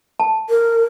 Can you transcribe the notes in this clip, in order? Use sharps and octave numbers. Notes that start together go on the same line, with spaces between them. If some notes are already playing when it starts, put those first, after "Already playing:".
A5
A#4